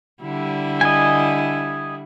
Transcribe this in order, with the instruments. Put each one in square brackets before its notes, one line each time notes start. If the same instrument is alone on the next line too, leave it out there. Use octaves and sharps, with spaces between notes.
[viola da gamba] D3 G3 E4
[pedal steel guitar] D#5 G#5